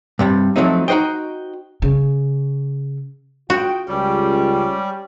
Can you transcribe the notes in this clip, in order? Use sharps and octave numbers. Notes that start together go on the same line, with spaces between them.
G2 C3 G3
F3 F#3 A3 C4 D#4
D#4 F#4 C5 D#5 G5
C#3
F4 F#4 G#4 G5
C#2 G3 C#4 G4